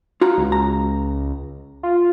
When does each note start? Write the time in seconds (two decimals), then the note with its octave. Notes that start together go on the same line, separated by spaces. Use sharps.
0.21 F4 F#4 A#5
0.38 C#2
0.52 A#5
1.83 F4